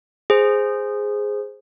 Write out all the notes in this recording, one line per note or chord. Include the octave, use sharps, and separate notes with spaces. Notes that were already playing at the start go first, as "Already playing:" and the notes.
G#4 C5